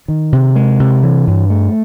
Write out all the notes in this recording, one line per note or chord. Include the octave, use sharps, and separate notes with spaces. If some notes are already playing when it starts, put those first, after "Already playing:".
D#3
C3
G#3
C3
E3
G2
A3